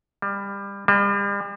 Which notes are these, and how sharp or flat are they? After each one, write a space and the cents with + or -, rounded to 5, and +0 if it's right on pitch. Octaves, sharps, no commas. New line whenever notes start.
G3 +25
G3 +40